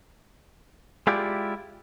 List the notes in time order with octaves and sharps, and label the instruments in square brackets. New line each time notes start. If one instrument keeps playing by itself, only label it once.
[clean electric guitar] G#3 E4 F4 G4 D5